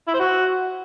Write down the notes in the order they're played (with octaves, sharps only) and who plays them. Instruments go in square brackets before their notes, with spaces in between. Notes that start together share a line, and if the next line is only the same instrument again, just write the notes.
[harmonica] E4
C5
F#4